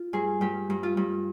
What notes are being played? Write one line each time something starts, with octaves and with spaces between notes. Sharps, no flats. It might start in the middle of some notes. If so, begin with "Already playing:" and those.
Already playing: F4
G2 G#4
G2 G4
G2
F4
G2